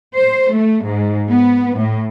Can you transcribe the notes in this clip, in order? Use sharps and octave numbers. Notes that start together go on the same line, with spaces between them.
C5
A3
G#2
B3
A2